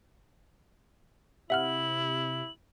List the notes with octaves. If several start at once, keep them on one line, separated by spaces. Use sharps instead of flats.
C3 E4 E5 F#5 F6 F#7